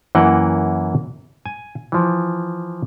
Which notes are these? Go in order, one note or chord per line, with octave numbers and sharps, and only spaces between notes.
F#2 E3 A#3 F#5 G5
G#5
E3 F3